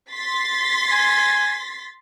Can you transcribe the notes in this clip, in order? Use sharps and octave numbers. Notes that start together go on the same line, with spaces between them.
C6 A6 B6
G#5